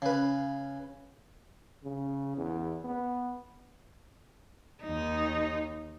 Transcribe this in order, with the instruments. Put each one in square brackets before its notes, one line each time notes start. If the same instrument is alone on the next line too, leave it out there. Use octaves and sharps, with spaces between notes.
[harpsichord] C#3 B4
[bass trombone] C#3
E2
B3
[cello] D#2 D#4